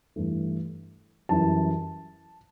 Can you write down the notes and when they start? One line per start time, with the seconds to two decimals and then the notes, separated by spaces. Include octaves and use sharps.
0.16 G2 E3 A3
1.29 F#2 E3 G3 A5